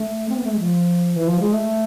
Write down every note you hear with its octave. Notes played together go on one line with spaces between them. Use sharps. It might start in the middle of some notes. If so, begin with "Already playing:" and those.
Already playing: A3
C4
B3
A3
G#3
F3
E3
F3
G#3
A3